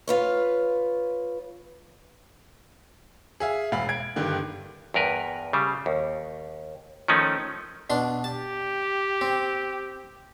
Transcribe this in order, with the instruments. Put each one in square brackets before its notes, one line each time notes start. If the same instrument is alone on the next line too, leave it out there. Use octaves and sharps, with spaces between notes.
[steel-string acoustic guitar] F4 B4 C#5
[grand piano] G#4 E5 F5
E1 F5 B5
G#6 D7
G2 D3 D#3
[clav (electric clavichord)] E2 G2 A#4 B4
C#3 G3
D#2
D#3 F3 A3 C#4 D#4
[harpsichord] B2 D4 C6
[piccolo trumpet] G4 [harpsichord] A5
[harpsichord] C4